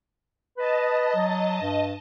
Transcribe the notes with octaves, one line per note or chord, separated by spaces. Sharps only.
B4 D#5 A5
F#3
G2